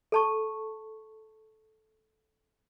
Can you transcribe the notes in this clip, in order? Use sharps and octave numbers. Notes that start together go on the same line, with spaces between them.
A4 A5 C#6